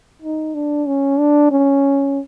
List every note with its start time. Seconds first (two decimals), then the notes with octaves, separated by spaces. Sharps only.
0.22 D#4
0.54 D4
0.86 C#4
1.19 D4
1.51 C#4